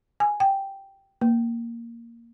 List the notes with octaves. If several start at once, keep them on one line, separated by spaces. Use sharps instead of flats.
G#5
G5
A#3